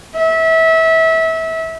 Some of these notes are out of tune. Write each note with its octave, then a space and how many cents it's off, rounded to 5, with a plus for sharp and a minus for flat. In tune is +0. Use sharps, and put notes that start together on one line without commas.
E5 -25